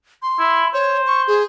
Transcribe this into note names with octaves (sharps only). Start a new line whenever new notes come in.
C6
E4
C5 C#5
C#6
G#4